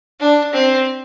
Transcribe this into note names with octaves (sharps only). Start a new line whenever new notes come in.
D4
C4